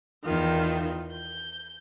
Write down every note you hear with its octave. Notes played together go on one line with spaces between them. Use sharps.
E2 D#3 F4
G6